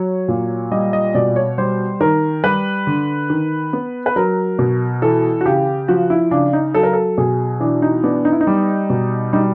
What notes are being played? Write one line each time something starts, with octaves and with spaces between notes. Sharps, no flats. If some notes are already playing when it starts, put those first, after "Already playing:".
Already playing: F#3 C#5
A#2
G3 D#5
D#5
B2 D5
C#5
G3 C5
D#3 A#4
G3 B4
D3
D#3
B3
B4
F#3 A#4
B2
E3 A4
F#4
C#3 G4
F3 F#4
E4
C#3 D4
D#4
F#3 A4
A#4
A4
B2 G#4
E3 D4
D#4
B3 D4
D#4
E4
D#4
G3
B2
G3 D#4